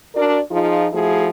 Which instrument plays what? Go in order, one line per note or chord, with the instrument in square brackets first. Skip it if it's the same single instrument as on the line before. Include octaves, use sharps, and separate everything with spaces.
[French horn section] D4 F#4 A#4 D5
F3 D#4 F4 G#4
F3 A3 E4 F#4 G#4